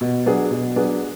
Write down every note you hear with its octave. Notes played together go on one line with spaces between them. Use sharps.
B2
F#3 B3 D4 G#4
B2
F#3 B3 D4 G#4